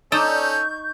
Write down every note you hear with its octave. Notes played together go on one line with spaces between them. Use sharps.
C#4 D#4 A4 D5 C#6 E6 G6